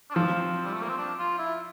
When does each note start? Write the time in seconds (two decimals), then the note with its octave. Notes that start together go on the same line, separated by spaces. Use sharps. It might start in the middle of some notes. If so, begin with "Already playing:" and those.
0.10 D4
0.15 F3 C4
0.65 G3
0.73 A3
0.81 A#3
0.89 C4
0.98 D4
1.19 F4
1.39 E4